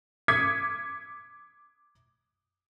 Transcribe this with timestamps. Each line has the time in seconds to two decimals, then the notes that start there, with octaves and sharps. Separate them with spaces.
0.28 D6 D#6 G#6 B6 C#7